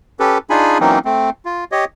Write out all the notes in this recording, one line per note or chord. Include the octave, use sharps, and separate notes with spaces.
C#4 G4 A4 B4
D4 D#4 F4 G#4 G#5 B5
E3 F#3 A#3 C4 C#4 D#4
A3 C4
F4
G4 C#5 D#5